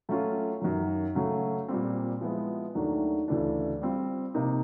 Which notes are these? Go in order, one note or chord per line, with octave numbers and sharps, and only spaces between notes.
F#3 A3 C#4 F4
F#2 D#3 F#3
C#3 F#3 A3
A#2 G3 C4
F3 G#3 B3 E4
D#2 D#3 F#3 A3 D4
D2 C#3 E3 A3 D4
G3 C4 F4
C3 F3 A#3 D#4 G4